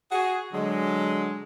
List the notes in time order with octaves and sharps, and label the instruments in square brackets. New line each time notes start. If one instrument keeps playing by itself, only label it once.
[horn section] F#4 G#4
D3 F#3 G#3